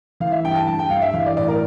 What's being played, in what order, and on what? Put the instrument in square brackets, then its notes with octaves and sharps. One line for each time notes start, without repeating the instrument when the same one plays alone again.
[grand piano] E3 F5
E5
G2 G5
A5
G2 A5
G5
G2 F5
E5
E3 F5
D5
A2 D5
A#4